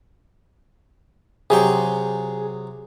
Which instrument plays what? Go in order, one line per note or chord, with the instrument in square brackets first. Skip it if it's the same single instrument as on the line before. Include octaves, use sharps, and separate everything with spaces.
[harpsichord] C3 F#3 G5 [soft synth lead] G#4